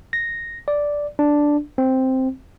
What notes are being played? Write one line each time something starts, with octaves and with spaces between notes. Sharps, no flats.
A#6
D5
D4
C4